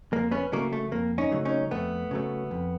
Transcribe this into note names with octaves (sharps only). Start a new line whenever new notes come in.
F2 A#3
B3 C#4
C#3 F#3 A3 A#3
A3
F2 A#3
C#4 D#4
C#3 F#3 A3
C#4 D#4
F2 A3 B3
C#3 F#3 A3
F2